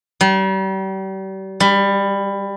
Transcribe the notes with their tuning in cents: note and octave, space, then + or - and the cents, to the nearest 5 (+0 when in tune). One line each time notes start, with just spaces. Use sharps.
G3 -35
G3 +20